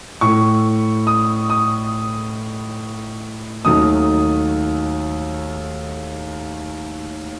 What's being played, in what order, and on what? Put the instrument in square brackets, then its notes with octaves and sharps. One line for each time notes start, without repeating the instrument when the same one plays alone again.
[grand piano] A2 A3 C#6
D#6
D#6
D#2 D#3 F#3 A3 D#6